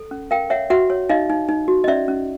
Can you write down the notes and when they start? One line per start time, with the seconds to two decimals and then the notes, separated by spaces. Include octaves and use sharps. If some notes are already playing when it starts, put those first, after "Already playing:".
Already playing: A4
0.11 C#4
0.31 A#4 F5 G5
0.50 C#5 E5 F#5
0.70 F#4 E5 F#5
0.90 C#5
1.09 D#4 D#5 F5
1.30 D#4
1.49 D#4
1.68 F#4
1.84 D#5
1.88 C#4 D5 E5
2.08 C#4